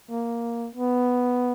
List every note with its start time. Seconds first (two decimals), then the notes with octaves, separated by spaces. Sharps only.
0.10 A#3
0.75 B3